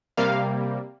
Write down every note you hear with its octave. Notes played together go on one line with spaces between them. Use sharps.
C3 G3 A#3 F5